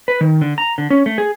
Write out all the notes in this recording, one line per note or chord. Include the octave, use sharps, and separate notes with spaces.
B4
D#3
D3
A#5
D3
C#4
A3
G#4